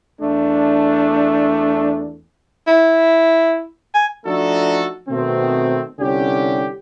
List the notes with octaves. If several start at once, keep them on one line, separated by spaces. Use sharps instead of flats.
E2 A3 D4
E4
G#5
F3 A3 D4 D#4 F#4 A4
B2 D#3 A3 C4
C2 D3 C#4 G4